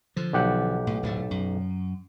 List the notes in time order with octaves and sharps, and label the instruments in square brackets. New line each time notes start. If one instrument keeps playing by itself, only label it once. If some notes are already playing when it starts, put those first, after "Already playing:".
[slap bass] D3 F3
[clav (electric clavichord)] B1 G4 F#5
[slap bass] A2
D1 A2 A3
F#2